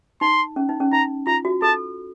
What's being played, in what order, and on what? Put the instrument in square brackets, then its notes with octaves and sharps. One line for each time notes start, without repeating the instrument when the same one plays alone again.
[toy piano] D#4 [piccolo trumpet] C6
[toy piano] C#4
D#4
C#4
[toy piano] D#4 [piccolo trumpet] A#5
[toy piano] F4 [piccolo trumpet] A#5
[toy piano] F#4
[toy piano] A4 [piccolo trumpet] A5